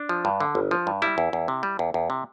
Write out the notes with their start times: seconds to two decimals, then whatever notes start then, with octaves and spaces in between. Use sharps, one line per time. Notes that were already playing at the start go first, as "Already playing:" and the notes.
Already playing: D4
0.09 F3
0.25 G2
0.40 D3
0.55 G1
0.71 F3
0.87 G2
1.02 G3 E4
1.18 E2
1.33 E2
1.48 C3
1.63 G3
1.79 E2
1.94 E2
2.10 C3